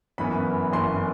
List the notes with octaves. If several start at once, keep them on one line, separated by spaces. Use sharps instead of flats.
G1 F#2 E3 B3 B5
G1 F#2 E3 B3 C6